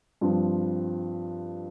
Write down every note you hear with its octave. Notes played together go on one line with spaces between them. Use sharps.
G2 F3 C4